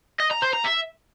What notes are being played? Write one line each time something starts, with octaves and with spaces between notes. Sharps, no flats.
D#5
A#5
C5
A#5
E5